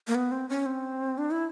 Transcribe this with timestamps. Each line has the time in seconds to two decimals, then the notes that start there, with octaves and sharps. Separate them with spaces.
0.07 A#3
0.15 B3
0.32 C4
0.49 C#4
0.66 C4
1.18 D4
1.31 E4